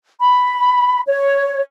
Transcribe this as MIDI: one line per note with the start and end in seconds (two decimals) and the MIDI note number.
0.21 1.00 83
1.07 1.61 73